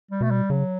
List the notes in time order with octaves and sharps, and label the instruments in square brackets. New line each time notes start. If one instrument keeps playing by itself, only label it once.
[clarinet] G3
[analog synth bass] B2 [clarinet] A3
[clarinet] G3
[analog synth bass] C#3 [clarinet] F#3